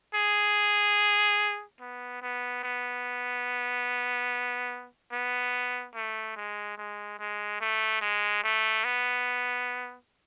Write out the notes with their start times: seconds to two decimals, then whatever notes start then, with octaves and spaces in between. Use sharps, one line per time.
0.15 G#4
1.81 B3
2.22 B3
2.64 B3
5.12 B3
5.95 A3
6.36 G#3
6.78 G#3
7.19 G#3
7.60 A3
8.01 G#3
8.44 A3
8.84 B3